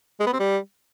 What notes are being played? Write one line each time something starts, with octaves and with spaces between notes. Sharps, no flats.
G#3
B3
C4
G3